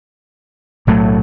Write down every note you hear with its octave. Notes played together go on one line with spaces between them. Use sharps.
B1 A2 F#3 A3